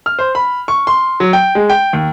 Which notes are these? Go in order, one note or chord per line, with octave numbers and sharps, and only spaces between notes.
F6
C5
B5
C#6
C6
F#3
G5
G#3
G5
D#2